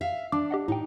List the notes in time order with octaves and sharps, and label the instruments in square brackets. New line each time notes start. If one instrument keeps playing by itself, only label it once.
[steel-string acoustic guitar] E5 F5
[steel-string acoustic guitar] D4 [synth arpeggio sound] D6
[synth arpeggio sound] G4 D#5 F#5
[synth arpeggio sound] A2 G5 [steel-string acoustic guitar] D#4